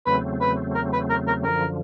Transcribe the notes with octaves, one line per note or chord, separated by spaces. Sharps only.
E2 C#3 F#3 A3 C4 B4
B4
A#4
B4
A#4
A#4
F#2 D3 F3 A#4